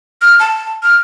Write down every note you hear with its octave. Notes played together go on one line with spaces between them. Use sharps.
F6
A5
F6